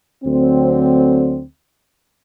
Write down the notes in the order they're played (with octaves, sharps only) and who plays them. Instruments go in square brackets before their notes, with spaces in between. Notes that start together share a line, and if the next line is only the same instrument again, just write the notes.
[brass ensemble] D2 D3 F#3 C4